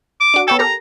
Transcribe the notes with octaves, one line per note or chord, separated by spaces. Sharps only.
D6
D4 F#4
B3 A4 C#5 G5
G4 A4 A#4 A#5